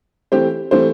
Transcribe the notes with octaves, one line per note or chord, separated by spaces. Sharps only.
E3 A3 C4 G4 C5
E3 A3 C4 G4 C5